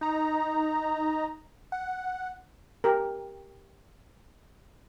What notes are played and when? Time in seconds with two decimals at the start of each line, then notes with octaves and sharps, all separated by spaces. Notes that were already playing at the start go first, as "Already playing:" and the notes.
0.01 D#4 A#5
1.72 F#5
2.84 G4 A#4